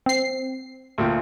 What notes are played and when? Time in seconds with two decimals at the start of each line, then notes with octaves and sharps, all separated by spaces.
0.06 C4 C7
0.98 D2 A#2 G5